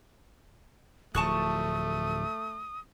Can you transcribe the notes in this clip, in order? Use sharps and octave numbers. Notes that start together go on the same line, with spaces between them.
D1 F3 A3 A5 C#6 D#6 F#6